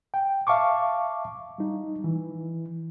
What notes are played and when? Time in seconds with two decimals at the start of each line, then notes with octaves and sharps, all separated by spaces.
0.14 G5
0.47 E5 F5 A5 C#6 D6
1.58 G3 D#4
2.04 E3